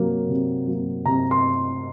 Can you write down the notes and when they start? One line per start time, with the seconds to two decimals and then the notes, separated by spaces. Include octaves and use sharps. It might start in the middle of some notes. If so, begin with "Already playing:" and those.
Already playing: C3 F#3 A#3
0.28 C3
0.67 F#3 A#3
1.05 C3 A#5
1.31 C6